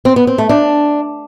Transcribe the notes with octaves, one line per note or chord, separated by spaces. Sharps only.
C4
B3
C4
A3
D4